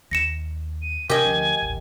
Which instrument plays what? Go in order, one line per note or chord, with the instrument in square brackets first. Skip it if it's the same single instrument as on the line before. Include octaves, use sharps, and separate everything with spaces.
[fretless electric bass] D#2 [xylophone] A#6 C#7 E7
[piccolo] D#7
[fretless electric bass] C3 [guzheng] G4 D#5 [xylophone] A#4 [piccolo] G#5
[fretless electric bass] D2 F3 C#4
D#1 A1